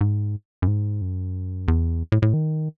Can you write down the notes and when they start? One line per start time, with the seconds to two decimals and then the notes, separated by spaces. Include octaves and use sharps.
0.01 G#2
0.62 F#2
0.67 G#2
1.01 F#2
1.68 E2
2.12 A2
2.22 A2
2.34 D#3